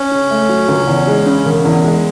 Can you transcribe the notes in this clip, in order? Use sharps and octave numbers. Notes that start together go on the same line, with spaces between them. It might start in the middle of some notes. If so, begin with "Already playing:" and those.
Already playing: C#4
C#3
A3
F#3
C#2
E2
G#3
C#3
E1
E2
G#3